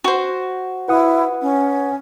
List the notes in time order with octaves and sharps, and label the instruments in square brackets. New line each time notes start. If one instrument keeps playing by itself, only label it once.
[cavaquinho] F#4 C5
[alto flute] E4 [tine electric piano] B4 F#5 D#6
[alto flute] C#4